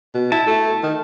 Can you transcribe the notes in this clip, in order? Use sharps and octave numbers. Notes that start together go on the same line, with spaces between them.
B2
E4 A5
A3
D#3